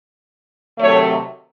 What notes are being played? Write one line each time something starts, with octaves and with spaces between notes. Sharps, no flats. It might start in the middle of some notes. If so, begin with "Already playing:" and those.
C3 D#3 F#3 A3 C#5